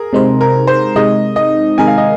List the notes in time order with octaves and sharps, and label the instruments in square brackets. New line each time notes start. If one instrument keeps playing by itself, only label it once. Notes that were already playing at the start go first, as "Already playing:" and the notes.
Already playing: [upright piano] G#4 A#4
[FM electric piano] C3 G#3 D#4 C5
[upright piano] A#4
C5
[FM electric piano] C3 G#3 D#4 [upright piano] D#5
[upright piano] D#5
[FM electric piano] C3 D#3 G#3 D#4 A#4 [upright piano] G#5
[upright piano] F5
D#5